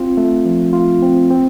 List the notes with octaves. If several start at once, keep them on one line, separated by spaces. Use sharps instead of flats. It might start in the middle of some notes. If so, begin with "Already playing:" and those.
Already playing: C4 F4
A3
F3
F4
C4
C4